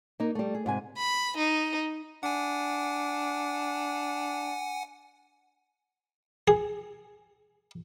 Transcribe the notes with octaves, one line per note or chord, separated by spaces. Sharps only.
A#3 D#4
G3 A3
G#4
G#2 C3 G#5
B5
D#4
D4 F#5 G#5
G#4